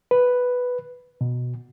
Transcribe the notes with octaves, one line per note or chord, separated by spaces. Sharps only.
B4
B2